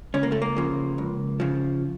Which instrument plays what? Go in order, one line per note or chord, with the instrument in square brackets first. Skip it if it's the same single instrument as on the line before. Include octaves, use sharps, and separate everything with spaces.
[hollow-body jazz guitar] C#2 C#4
A#3
A3
A#3
C#3 F3
C#2
C#3 F3